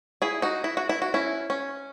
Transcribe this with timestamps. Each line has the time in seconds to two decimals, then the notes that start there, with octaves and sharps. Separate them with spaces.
0.22 E4 G#4
0.42 D#4 F#4
0.64 E4
0.77 F#4
0.89 E4
1.02 F#4
1.14 C#4 E4
1.50 C#4